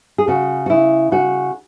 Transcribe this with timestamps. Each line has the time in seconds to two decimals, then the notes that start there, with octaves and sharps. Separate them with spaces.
0.18 G#4
0.28 C#3 F#4
0.66 F#4
0.69 C#3 E4
1.12 C#3 F#4